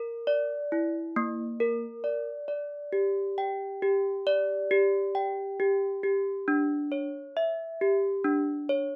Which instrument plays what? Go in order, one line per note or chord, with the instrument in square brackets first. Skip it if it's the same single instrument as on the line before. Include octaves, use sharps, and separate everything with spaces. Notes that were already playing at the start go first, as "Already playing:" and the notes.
Already playing: [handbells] A#4
D5
E4
A#3
A#4
D5
D5
G4
G5
G4
D5
G4
G5
G4
G4
D4
C#5
E5
G4
D4
C#5